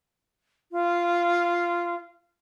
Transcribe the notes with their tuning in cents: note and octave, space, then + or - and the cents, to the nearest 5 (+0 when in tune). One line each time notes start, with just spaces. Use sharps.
F4 -10